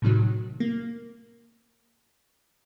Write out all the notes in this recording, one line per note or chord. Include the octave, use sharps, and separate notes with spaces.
A2 C3 D#3 F#3
A#3